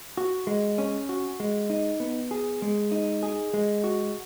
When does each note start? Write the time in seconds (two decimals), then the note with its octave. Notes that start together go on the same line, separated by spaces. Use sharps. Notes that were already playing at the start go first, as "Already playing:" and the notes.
0.17 F#4
0.47 G#3
0.78 C#4
1.09 F#4
1.40 G#3
1.70 D#4
2.00 B3
2.31 G#4
2.62 G#3
2.91 D#4
3.23 G#4
3.54 G#3
3.84 F#4